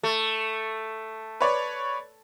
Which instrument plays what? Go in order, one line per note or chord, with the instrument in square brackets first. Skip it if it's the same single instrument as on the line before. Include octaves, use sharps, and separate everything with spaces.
[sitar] A3
[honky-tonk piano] B4 C#5 D5